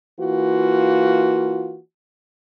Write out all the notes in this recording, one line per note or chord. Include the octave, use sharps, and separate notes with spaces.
E3 A#3 F4 F#4